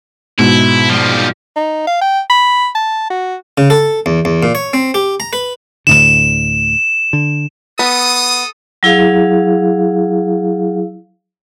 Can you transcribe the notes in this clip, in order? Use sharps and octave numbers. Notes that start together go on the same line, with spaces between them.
G#2 B2 E4
F3 G3
D#4
F5
G5
B5
A5
F#4
C#3
A4
E2
E2
A#2
C#5
C4
G4
A#5
B4
D2 A2 D3 E7
D3
B3 A4 D#6
F#3 E4 G#4 F5